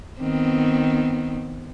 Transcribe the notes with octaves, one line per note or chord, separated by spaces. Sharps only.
D#3 B3 C4